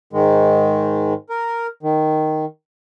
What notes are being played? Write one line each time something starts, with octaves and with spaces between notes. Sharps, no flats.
G#2 D#3 G#3
A#4
D#3